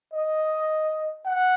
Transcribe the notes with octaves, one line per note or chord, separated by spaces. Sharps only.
D#5
F#5